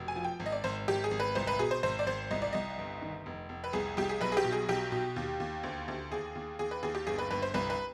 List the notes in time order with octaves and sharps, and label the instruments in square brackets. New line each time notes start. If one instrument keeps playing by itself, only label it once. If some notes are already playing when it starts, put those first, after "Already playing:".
Already playing: [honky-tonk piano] F1 B2
G#5
F3
G5
G#1
D#5
D5
G#1 C5
G#1 G4
G#4
G#1
B4
C2 C5
B4
B2 G#4
C5
G#1 C5
D5
G#1 C5
C2 D#5
D5
C2 D#5
G1
D#3
F1
F1
B4
C2 G#4
C2 G4
G#4
B1 B4
G#4
G4
B2
G#4
B1 G4
B2
D#2
D#2
D2
D2
D#2 G#4
D#2
D#2 G#4
B4
D#2 G#4
G4
G1 G#4
B4
G1 B4
C5
C2 B4
B4